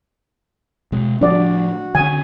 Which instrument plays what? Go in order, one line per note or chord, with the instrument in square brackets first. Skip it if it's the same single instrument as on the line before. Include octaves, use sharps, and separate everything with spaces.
[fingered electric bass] B2 G#3
[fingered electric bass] A2 F3 A3 [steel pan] D4 D5 [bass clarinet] F#4
[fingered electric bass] D3 C#4 [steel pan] G#5